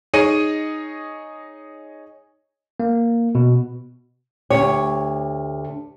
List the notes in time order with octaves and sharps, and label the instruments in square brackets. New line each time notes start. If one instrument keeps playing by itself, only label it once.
[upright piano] D#4 G#4 C#5 D#5 D#7
[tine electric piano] A#3
B2
[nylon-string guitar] D2 C#5 [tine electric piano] G4